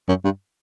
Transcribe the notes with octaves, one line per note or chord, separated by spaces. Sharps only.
F#2
G2